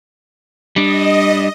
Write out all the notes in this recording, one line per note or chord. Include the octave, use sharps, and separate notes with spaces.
G3 D4 D#5